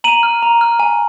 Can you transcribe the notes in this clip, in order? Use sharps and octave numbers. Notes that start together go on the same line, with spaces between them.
A#5 D#7 F#7
F6
A#5
F6
G#5